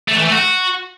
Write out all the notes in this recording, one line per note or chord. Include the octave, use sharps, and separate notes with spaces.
A3
E3
A3
F#4